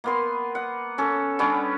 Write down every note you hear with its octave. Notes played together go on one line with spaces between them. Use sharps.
A#3 B3 C6
F#5
C#4 A4
G3 B3 C#4 D4